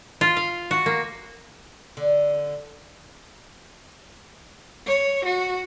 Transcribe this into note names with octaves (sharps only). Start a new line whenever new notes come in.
F4
F5
F#4
A#3
D3
C#5
F#4